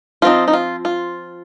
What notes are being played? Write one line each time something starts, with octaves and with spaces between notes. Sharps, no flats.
F3 C4 D#4 F4
D#4
F4
F4